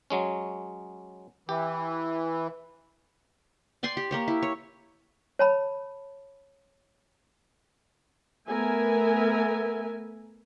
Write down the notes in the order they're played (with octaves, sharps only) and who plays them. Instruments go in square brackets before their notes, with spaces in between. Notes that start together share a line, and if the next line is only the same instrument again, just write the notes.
[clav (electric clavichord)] F#3 G#3 C#4
[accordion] E3 [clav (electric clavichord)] G4
[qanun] D5 G5 G#5 C6
G4
A#3 G4 C#5
E4
C#5
[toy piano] C#5 A5 B5
[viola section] A3 B3 A#4 E5 G#5